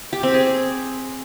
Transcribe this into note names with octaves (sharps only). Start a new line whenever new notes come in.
G4
C4
G#4